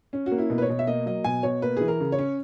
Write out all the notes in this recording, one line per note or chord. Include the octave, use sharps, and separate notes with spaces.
C#4
F#4
A#3
E4
B2
B4
C#5
B2
E5
A#3 D#5
F#3 D#5
B2 G#5
B2 C#5
A#3 B4
E3 G#4
A#4
C#3
C#5
C#4